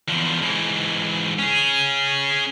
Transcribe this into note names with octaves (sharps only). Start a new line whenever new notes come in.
E2 F3
G#2 E3
C#4 G#4